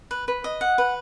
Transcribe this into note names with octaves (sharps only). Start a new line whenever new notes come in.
B4
B4
D#5
F#5
B4